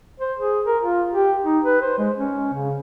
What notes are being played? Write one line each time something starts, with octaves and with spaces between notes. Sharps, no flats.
C5
G#4
A#4
F4
G4
D#4
B4
C5
G#3
C#4
C#3